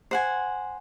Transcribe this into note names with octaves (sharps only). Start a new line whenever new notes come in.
C5 F#5 G#5